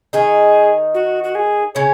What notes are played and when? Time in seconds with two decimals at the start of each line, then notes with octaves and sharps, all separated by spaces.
0.13 D#3 D#4 G#4
0.94 F#4
1.24 F#4
1.35 G#4
1.75 C#3 C#4 C#5